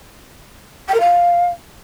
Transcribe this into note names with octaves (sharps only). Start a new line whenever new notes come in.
G5
A#4
F5